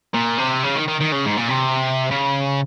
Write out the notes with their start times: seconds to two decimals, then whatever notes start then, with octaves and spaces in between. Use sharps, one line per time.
0.14 A#2
0.38 C3
0.63 C#3
0.76 D#3
0.88 D#3
1.00 D#3
1.12 C#3
1.25 G#2
1.37 A#2
1.49 C3
2.11 C#3